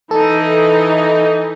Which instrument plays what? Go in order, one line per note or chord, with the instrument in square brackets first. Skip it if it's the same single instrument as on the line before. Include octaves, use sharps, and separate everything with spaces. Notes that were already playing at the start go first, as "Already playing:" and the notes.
[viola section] E3 D#4 [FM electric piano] A4